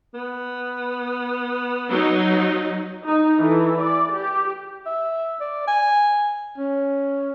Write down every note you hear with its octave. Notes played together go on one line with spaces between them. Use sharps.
B3
F#3 D#4
D#4
E3 A4
D5
G4
E5
D5
G#5
C#4